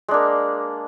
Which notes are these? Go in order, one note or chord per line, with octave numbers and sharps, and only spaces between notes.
G#3 A#3 D4